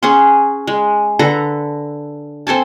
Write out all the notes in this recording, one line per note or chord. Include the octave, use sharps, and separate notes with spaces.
C#4 G#4 F#5 C6
G#3
D3 A4 B4 A#5
C4 A4 G#5 A5